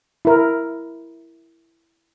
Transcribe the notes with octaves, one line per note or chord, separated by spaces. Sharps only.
E4 A#4